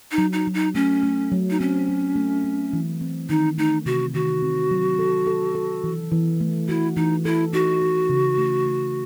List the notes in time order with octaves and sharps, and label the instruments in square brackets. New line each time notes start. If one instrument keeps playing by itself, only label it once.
[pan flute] D#4
[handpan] F#3
[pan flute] D#4
[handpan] F#3
[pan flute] D#4
[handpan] A3 [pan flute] C#4
[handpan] A3
F#3
[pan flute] D#4
[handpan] C4 [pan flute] C#4
[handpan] F#3
A3
C4
E3
C4
[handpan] D#3 [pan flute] D#4
[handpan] A3 [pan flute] D#4
[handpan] C3 [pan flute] F#4
[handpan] D#3 [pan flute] F#4
[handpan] C4
F#3
A4
A4
A4
E3
E3
A3
[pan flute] E4 [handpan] F#4
[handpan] E3 [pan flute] D#4
[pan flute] E4 [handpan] A4
[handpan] D#4 [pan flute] F#4
[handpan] D#4
C#3
A3
A3